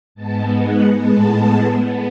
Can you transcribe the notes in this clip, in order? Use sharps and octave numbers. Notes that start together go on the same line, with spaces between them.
G#2 G#3 B3 A5
F#5
A2 G#3 B3 A5
B3